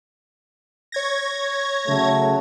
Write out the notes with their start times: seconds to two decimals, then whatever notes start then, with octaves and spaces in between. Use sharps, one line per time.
0.92 C#5 G#6 A#6
1.88 C#3 F#3 A3